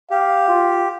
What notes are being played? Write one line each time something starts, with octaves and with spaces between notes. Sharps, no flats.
G4 F5
F4